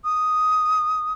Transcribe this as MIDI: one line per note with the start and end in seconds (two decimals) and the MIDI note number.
0.04 1.13 87